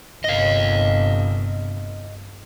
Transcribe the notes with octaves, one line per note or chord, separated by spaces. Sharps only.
G1 C3 D#5 F5